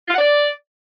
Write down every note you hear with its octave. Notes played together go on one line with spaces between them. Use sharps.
F4
F#5
D5